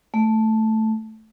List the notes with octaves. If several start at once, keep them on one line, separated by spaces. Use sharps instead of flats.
A3